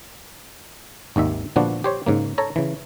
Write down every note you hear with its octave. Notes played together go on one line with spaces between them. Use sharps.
G#1 D#2 D#3 E5
A#2 D3 F3 B3 D4 F#4
G4 C5 C#5
G#2 C#3 A#3
A4 C#5 A#5
C#3 E3